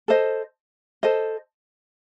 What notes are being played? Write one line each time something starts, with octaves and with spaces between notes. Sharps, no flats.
A4 C5 D#5
A4 C5 D#5